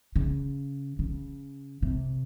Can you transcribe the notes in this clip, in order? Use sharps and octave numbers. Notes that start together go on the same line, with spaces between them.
C#3
C#3
C3